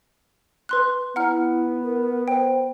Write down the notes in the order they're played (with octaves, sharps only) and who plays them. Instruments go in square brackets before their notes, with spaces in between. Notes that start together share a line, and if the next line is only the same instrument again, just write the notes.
[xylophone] B4 C6 F#6
[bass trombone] B3 [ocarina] E4 [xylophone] F#5 A#5 F6
[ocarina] A#4
[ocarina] C5 [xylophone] G5